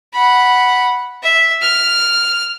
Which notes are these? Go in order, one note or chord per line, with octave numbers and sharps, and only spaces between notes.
F#5 B5
E5
F6